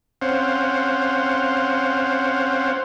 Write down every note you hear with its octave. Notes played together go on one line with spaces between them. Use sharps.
C4 C#4 C5 F5 F#5